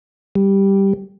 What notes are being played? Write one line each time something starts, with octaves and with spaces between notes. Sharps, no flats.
G3